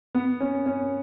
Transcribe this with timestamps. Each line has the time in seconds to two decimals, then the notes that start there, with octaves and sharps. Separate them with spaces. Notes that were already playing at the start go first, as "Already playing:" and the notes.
0.15 B3
0.40 C#4
0.66 C#4